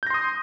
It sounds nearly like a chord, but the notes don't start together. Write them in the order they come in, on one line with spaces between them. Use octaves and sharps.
G6 A#6 C6 D#6